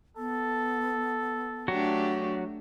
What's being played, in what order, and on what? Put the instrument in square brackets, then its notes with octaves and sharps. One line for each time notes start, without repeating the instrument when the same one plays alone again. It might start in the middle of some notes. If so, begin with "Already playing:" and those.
[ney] B3 [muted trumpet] A4
[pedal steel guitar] F#3 F#4 [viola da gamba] A3 D4 G4